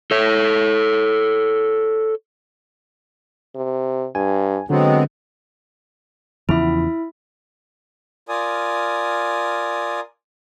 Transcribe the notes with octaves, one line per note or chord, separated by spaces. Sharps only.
A4 C#5
C3
G2 G#5
D3 F#3 G#3 B3 C4
E2 C#3 F3 E4 E5
F4 A#4 D5 G#5 D#6